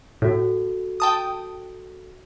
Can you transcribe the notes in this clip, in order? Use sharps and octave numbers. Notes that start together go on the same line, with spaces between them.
A2 F#4 A4
G5 A5 D#6